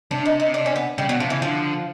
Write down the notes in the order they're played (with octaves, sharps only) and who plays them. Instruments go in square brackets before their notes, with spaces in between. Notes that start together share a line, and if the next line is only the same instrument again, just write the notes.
[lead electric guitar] C3 [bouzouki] D4
[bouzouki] D#4
D#4
D4
C#4
B3
[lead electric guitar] C#3 [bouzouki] G3
[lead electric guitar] B2 [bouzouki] F#3
[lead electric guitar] C3 [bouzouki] F3
[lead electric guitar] C#3 [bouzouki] E3
[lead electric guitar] D3 [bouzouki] F3